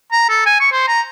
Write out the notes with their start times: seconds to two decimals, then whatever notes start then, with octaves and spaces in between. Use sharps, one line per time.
0.12 A#5
0.29 A4
0.46 G#5
0.60 C#6
0.72 C5
0.88 A#5